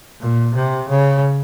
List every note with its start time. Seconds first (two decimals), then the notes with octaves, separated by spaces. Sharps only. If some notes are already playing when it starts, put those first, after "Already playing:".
0.20 A#2
0.55 C3
0.89 C#3